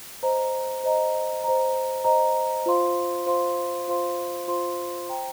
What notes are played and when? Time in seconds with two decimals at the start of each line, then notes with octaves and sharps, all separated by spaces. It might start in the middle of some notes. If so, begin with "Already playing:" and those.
0.23 C5 D#5 A#5
0.84 C5 D#5 A#5
1.44 C5 D#5 A#5
2.04 C5 D#5 A#5
2.66 F4 C5 F5 C6
3.26 F4 C5 F5 C6
3.88 F4 C5 F5 C6
4.48 F4 C5 F5 C6
5.09 C5 G5 A#5